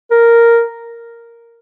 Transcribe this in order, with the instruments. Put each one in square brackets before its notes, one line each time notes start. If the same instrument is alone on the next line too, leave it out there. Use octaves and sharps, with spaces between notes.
[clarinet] A#4